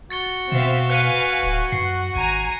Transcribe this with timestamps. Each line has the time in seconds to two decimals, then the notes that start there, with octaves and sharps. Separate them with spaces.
0.10 F#4 A6 C#7 G7
0.52 B2 C4 E5 F5
0.90 B4 F5 G#5 F#6 C#7 D#7
1.43 D1
1.72 F#2 F#5 C7
2.16 G#1 G#5 A#5